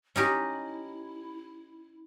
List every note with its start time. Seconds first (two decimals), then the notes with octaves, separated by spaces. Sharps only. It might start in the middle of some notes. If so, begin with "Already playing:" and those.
0.16 C#4 D#4 E4 G4